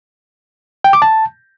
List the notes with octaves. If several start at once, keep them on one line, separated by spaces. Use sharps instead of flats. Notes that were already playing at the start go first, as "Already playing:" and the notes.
G5
D6
A5